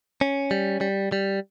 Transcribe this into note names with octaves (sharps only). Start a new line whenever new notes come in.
C#4
G3
G3
G3